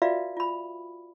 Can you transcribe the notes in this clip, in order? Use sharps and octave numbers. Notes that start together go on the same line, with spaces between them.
F4 F#4 B4 D5 E5 F5
F4 B5